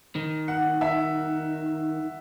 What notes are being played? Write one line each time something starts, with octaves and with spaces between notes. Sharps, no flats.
D#3
F#5
E5